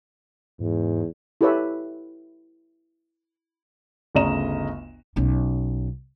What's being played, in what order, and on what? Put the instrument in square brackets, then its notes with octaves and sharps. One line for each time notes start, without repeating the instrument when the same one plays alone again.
[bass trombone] E2 [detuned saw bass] G#2
[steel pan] E4 G4 A4 B4 C#5 E5
[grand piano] G1 D2 C#3 D#5 A#5 E7
[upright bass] B1 C#4